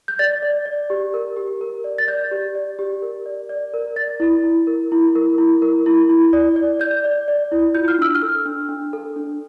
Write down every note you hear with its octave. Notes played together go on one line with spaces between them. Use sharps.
G6
D5 A6
D5
D5
G4
A#4
G4
A#4
D5
A6
D5 G6
G4
D5
G4
A#4
D5
D5
A#4
D5 A6
E4
E4
A#4
E4
A#4
E4
A#4
E4
E4
D5
D5
D5 G6
D5
D5
E4
F4 G6
F6
D4 E6
F6
A4
D4
D4
A4
D4